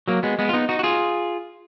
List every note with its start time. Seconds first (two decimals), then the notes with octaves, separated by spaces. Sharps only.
0.08 F#3 A#3
0.23 G#3 B3
0.39 G#3 B3
0.49 F4
0.53 B3 D#4
0.69 D#4 F#4
0.79 F#4
0.83 F4 G#4